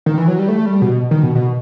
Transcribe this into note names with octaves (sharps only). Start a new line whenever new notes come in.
D#3
E3
F#3
G3
A3
G3
B2
D#3
B2
B2